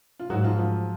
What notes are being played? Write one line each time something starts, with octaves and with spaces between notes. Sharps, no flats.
F4
G#2 F#3 F#4
F3 F4
F3 F4